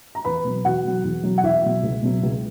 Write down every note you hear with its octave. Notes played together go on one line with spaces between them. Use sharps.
A#5
E2 B4 B5
B2 F#3
E2 F#4 F#5
B2 F#3
E2
B2 F#3
F#5
E2 E4 E5
B2 F#3
C#2
B2 F#3
C#2